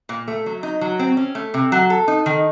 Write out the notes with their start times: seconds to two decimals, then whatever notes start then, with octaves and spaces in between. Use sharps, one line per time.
0.09 A#2
0.28 A3
0.46 F#3
0.63 D#4
0.81 F#3
0.99 C4
1.17 C#4
1.35 A3
1.54 C3
1.72 F#3
1.90 A4
2.08 D#4
2.26 D#3